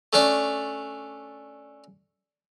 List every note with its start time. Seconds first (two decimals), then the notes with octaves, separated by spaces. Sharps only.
0.13 A3 C#4 D4 C#5 D5